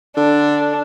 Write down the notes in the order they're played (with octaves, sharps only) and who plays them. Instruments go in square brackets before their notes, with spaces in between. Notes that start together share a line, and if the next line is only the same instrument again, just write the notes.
[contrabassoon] D3 [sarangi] D4